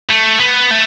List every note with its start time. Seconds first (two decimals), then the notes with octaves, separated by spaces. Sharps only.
0.11 A3
0.40 B3
0.71 A3